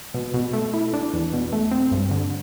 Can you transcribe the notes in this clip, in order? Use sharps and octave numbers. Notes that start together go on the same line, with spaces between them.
B2
B2
A3
E4
D4
E2
B2
A3
C4
G2
D3